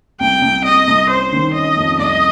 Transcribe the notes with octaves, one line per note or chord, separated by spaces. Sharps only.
C2 G5
C2
C3 D#5
C2
C#4 C5
D#3
C#4 D#5
F2
C2 D#5